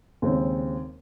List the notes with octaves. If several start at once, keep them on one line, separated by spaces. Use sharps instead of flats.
D#2 C#3 G#3 C4